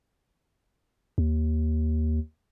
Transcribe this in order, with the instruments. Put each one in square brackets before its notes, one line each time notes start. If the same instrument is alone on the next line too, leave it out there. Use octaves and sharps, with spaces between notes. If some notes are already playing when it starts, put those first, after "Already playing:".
[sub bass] D#2